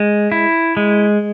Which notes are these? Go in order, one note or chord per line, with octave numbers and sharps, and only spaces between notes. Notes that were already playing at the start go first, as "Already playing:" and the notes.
Already playing: G#3
E4
G#3